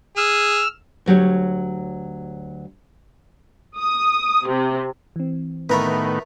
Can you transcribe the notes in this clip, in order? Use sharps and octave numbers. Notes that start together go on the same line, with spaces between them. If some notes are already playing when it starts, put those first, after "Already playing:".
G#4 E6 F6
D2 F#3 G4 C#5
D#6
C3
E3 C4
A2 D#3 A3 B3 A#4 B4